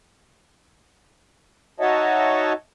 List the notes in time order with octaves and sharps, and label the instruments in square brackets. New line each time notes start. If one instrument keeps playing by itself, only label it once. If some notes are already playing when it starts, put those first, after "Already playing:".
[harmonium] D#4 F#4 C#5 D#5 E5 A5